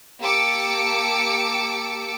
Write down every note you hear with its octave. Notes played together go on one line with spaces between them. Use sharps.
A#3 G4 A5 D6 E6 C#7